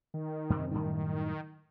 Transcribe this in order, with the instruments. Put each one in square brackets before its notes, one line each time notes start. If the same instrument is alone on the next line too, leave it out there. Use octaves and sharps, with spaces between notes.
[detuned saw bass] D#3
[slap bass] F#2 C3 C4
[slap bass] F#2 A2 G3 [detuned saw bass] D#3